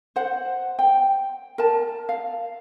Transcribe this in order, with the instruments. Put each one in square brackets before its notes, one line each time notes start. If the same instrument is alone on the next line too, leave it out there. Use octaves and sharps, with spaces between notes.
[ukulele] C5 F#5
G5
A#4 A5
F5